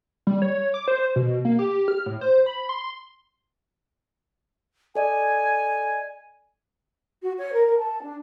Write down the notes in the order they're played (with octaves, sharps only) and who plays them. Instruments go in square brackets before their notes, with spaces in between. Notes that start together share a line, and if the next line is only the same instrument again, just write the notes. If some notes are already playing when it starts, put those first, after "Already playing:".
[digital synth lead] G3
C#5
D6
C5
B2
A#3
G4
F6
A2
C5
B5
C6
[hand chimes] A4 D5 D#5 [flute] G#5
[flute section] F#4
C#5
A#4
A#4
A5
D4